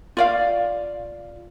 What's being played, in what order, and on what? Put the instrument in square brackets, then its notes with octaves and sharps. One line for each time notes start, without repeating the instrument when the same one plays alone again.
[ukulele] F4 D5 F5